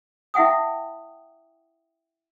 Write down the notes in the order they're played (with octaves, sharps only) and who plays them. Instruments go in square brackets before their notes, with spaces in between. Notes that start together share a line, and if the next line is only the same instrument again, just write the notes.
[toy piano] E4 E5 F#5 G5 D#6